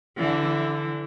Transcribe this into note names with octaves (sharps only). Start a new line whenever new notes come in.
D3 E3